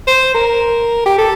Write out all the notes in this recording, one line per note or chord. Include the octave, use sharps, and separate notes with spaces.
C5
A#4
G4
A4